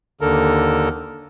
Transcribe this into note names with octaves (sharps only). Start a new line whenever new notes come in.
D#2 D3 A4 A#4